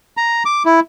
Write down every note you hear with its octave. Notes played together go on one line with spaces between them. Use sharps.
A#5
D6
E4